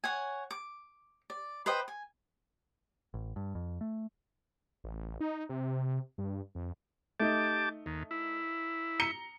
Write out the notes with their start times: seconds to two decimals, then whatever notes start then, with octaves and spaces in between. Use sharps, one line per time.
0.04 C#5 F#5 G#5
0.51 D6
1.30 D5
1.66 B4 C5 D#5 G5
1.88 G#5
3.14 A1
3.36 G2
3.55 F2
3.81 A3
4.84 A1
5.20 D#4
5.49 C3
6.18 G2
6.55 F2
7.20 A3 D#4 G4 A5 D6
7.86 D#2
8.11 E4
9.00 A#5 C#7 G7